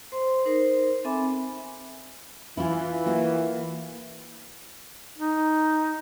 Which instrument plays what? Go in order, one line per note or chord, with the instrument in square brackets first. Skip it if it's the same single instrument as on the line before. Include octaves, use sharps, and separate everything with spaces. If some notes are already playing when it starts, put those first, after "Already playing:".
[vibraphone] C5 C6
D#4 A#4 C5
C4 A4 E5 G#5 B5 D6
[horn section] E3 [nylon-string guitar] E4 F4
[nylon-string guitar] A#3 F4 F#4
[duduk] D#4